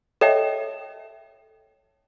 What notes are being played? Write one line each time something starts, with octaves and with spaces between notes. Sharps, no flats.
A4 C#5 D#5 E5 G5 A5